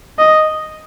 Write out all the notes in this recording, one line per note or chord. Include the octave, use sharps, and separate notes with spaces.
D#5